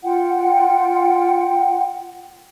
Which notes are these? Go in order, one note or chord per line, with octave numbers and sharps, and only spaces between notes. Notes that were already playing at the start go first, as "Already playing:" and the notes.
F4 F#5 G5